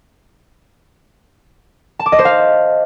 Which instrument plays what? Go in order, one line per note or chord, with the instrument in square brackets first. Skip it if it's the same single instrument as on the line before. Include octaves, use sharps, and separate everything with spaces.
[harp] A5
D6
D#5
C5
F5